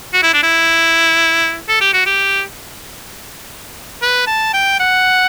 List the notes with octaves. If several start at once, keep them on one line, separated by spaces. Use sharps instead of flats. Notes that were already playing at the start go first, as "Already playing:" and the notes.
F#4
E4
D4
E4
A4
G4
F#4
G4
B4
A5
G5
F#5